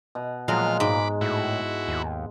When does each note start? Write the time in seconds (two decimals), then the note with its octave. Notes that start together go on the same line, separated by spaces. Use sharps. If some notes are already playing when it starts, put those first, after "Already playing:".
0.15 B2
0.48 A#2 F3 F#3 G#3 F6
0.80 G#2 B5 D6
1.21 A2 E4 F#4
1.88 D#2